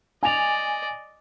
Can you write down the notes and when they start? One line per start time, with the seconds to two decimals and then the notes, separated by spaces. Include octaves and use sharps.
0.23 D5 D#5 G#5 F7